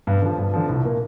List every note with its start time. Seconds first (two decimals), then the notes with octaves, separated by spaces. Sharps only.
0.07 G2
0.22 D3 F3
0.38 G2
0.54 D3 F3
0.69 C2
0.85 A#2 A#3